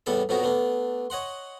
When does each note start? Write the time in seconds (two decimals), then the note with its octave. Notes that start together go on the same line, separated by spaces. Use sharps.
0.06 E2 A2 G3 B3 A4 E5
0.29 F2 A2 B3 D#4 F#4 A#4
0.43 A3 B3 D4
1.10 C#5 D#5 F#5 C6